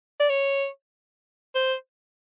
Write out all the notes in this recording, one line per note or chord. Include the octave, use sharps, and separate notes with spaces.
D5
C#5
C5